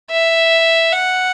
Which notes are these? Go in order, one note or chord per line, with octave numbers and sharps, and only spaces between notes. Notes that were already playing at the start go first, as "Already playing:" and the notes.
E5
F#5